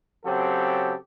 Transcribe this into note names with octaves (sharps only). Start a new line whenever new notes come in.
C#3 F#3 C4 G4 A4